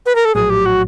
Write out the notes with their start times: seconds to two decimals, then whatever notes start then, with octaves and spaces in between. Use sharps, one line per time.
0.06 B4
0.15 A#4
0.25 A4
0.35 A#1 A2 F#3 G#4
0.50 G4
0.66 F#4